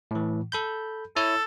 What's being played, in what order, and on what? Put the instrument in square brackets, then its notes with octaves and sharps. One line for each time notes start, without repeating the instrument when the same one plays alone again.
[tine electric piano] A2 E3
A4 B5 G6
[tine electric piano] E4 C#5 [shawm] A4